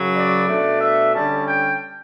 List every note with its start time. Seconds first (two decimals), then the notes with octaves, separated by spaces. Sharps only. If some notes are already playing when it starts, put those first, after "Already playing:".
Already playing: F#2 C#3 F#3 C#4
0.15 D5
0.48 B2 A3 D4
0.81 E5
1.14 D3 G3 C#4 A5
1.46 G5